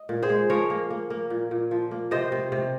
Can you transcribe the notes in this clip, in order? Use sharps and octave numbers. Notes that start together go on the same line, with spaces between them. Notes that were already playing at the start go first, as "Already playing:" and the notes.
Already playing: D#5
A#2
G#4 C5
G#3
F3 A#4 C#5
A#3
A#3
A#3
A#2
A#2
F3
A#3
C3 C5 D#5
C3
C3